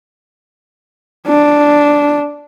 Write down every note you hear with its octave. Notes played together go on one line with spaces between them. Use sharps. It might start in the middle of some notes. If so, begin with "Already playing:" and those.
D4